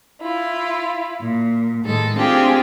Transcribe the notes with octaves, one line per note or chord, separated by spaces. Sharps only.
E4 F4
A#2
A2 D#3 G#3 A4
A3 C4 D4 F4 G4 G#4